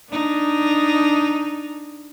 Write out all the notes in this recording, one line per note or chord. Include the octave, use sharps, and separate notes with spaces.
D4 D#4